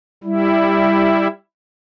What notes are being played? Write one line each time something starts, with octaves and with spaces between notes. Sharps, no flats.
G3 E4